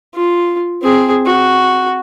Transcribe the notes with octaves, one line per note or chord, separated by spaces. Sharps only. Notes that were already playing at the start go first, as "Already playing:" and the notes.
F4
C4 G#4
F#4